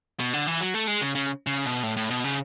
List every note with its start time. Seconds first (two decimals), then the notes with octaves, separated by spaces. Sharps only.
0.20 B2
0.33 D3
0.47 E3
0.61 F#3
0.74 A3
0.87 G#3
1.01 C#3
1.15 C#3
1.47 C#3
1.65 B2
1.83 A2
1.97 A2
2.10 B2
2.24 C#3